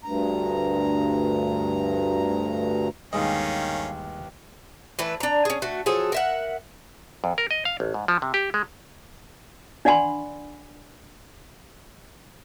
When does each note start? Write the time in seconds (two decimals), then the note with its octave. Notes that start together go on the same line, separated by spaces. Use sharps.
0.04 D2 G2 A#5
3.13 G1 D#2 D#3 G#3 C#4 D#5 F5
4.99 E3 A3 B4
5.20 D4 A#5
5.45 C#4 G#4
5.62 A3 F#4
5.86 F3 F#3 G#4 A4
6.12 A#4 E5 F#5
7.24 F2
7.38 A#4
7.51 D#5
7.65 F5
7.80 A1
7.94 G#2
8.08 F3
8.22 C3
8.34 G4
8.54 G#3
9.85 D4 D5 F#5 G#5 B5 C6